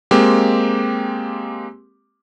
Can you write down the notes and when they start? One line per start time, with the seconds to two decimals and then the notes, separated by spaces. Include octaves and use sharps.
0.11 G#3 A#3 C4 G4